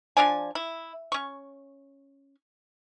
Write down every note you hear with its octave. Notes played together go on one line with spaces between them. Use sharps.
F3 D4 D5 G#5
E4
C#4 C#6